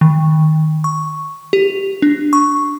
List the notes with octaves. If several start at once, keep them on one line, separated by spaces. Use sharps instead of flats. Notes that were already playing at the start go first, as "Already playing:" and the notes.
D#3
C#6
G4
D4
C#6